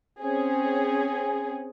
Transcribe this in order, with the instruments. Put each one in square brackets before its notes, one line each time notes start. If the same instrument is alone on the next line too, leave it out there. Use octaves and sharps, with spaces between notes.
[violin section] C4 C#4 G#4